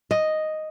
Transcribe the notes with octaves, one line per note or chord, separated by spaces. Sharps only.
D#5